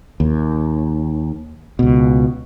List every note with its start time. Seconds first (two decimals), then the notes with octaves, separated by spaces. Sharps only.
0.20 D#2
1.79 C#2 B2